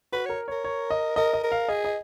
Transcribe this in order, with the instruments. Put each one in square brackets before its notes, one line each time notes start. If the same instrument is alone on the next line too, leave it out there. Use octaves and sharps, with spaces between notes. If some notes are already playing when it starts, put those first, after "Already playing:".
[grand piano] F#4 [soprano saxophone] B4
[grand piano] A#4 [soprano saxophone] C#5
[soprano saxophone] A#4 [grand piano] C#5
[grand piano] C#5
D#5
[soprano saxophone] A#4 [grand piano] D#5
[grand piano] D#5
[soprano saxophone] A#4
[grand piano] F5
[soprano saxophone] G#4 [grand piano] D#5
[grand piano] D#5